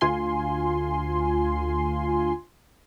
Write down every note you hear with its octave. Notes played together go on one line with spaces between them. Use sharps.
D2 F4 G#5 C6